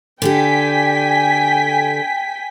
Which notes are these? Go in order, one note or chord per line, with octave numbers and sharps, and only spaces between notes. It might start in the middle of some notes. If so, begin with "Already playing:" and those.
D3 G4 A4 G5 G#5 B6